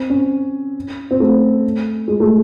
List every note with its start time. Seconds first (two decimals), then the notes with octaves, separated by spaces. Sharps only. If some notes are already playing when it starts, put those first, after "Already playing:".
Already playing: C4
0.10 C#4
1.11 C4
1.20 A3
2.08 G#3
2.20 A3